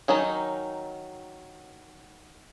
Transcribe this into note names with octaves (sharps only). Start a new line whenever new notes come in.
D#3 F#3 C#4 D#4